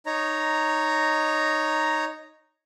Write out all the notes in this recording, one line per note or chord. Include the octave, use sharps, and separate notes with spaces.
D#4 C#5 A#5